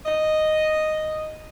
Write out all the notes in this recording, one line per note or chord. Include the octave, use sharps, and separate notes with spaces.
D#5